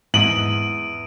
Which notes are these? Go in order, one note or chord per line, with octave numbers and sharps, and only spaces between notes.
E2 G#2 D#6 D7 D#7 F#7